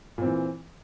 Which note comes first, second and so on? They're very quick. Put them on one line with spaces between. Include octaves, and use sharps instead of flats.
A#2 C4 E3